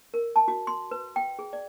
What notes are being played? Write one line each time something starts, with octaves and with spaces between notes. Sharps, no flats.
A#4
A5
F#4
C6
B4
G5
G#4
D5